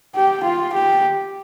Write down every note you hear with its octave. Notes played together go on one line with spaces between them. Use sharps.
G4
F4
G4